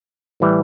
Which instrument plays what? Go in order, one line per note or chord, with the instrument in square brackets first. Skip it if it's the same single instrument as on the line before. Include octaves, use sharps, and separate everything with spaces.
[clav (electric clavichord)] A2 E3 G3